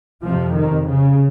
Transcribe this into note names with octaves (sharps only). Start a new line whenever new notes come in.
F2 C3 F3
D#3
C#3